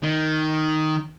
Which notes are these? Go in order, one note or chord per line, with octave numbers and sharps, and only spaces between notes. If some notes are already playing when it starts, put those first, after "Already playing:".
D#3